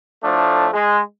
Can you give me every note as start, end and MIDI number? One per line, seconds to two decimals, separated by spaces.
0.23 0.67 45
0.23 0.67 53
0.23 0.67 57
0.23 0.67 62
0.73 1.00 56